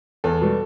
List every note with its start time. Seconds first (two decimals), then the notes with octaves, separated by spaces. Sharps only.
0.24 E2 A4
0.41 B2 G3